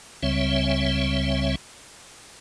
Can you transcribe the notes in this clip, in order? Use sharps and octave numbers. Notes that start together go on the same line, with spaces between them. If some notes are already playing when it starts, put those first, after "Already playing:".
C#2 C#3 G3 C4 C#5 E5